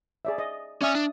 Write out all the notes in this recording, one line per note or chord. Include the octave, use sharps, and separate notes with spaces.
G#4 D5 E5
D#5
C#4 D5 E5 G#5 D#6
D4